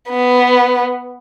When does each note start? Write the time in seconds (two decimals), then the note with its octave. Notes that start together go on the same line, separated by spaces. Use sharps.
0.10 B3